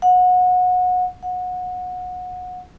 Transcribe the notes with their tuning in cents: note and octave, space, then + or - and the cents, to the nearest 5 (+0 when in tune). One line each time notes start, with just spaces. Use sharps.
F#5 -25
F#5 -25